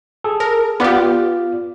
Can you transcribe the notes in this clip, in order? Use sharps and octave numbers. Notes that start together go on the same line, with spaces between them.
G#4 A4
A#4
B3 F4 G4 D5 F5